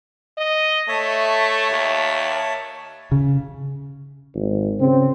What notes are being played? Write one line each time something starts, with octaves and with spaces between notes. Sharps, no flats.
D#5
A3 C#5 E5 A5
D#2
C#3
G#1
C#3 C4